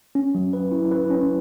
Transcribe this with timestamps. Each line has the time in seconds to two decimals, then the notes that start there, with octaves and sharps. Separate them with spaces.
0.15 C#4
0.35 F#3
0.53 B4
0.72 E4
0.91 B4
1.10 C#4